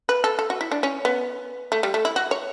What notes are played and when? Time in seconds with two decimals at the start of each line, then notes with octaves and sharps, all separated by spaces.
0.09 B4
0.24 A4
0.39 A4
0.50 F#4
0.61 E4
0.72 D4
0.83 C#4
1.05 B3
1.72 A3
1.83 G3
1.94 A3
2.05 E4
2.16 F#4
2.31 C#5